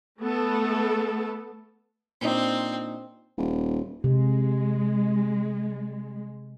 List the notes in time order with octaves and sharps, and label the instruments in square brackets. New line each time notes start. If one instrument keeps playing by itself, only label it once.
[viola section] A3 B3 A4
[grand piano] A#2 D4 D#4 [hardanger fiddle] C4
[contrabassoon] D#1
[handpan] C3 [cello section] G#3